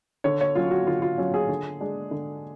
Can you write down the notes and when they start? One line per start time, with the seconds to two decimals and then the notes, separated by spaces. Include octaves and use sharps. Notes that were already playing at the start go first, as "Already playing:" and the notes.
0.24 D3 C#5
0.41 C#5
0.55 F#3 C#4 F4
0.71 F#4
0.87 D3 F4
1.02 F4
1.18 F#3 C#4
1.34 G#4
1.49 D3
1.81 G#3 D4
2.11 D3